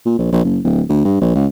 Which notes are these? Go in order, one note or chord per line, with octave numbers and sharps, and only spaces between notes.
A#2
A#1
A#1
F#1
D1
D2
G2
A#1
C#2